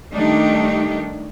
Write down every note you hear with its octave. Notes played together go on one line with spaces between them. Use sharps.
D#3 G3 A3 D4 D#4 G4